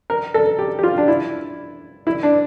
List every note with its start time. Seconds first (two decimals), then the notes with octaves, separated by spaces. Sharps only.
0.10 A#4
0.34 A4
0.59 G4
0.79 G4
0.83 F4
0.98 D4
1.08 E4
2.07 E4
2.23 D4